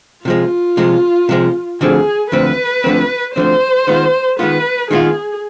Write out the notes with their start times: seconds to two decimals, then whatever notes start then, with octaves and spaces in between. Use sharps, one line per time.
0.25 C3 F3 G#3 F4
0.77 C3 F3 G#3
1.29 C3 F3 G#3
1.81 D2 D3 F3 C4 G#4
2.32 D2 D3 F3 C4 B4
2.84 D2 D3 F3 C4
3.36 D2 D3 F3 C4 C5
3.87 D#3 G#3 B3 F4
4.39 D#3 G#3 B3 F4 B4
4.91 D#3 G#3 B3 F4 G#4